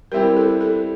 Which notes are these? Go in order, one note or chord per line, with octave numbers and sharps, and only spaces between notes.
G3 C4 E4 G4 A#4
A4
A4